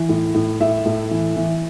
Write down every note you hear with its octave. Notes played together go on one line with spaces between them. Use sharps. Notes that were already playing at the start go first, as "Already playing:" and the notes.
Already playing: E3
A2
A2
A2 E5
A2
E3
E3